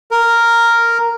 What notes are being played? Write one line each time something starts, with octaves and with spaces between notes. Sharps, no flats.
A#4